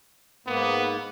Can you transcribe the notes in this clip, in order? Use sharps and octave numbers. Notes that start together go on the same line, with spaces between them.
G#2 A#3 B3